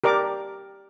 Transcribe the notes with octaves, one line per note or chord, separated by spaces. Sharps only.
G4 A#4 D5 D6